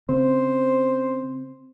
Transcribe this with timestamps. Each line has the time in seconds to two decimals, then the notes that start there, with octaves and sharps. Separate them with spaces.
0.09 C#3 C4 C5